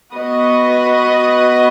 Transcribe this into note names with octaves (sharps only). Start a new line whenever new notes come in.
B3 F#4 B4 D#5